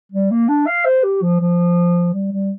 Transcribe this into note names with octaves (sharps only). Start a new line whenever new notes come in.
G3
A#3
D4
F5
C5
G4
F3
F3
G3
G3